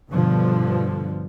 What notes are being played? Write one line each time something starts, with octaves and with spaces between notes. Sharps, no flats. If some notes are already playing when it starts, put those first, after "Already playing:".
G2 B2 D3 F3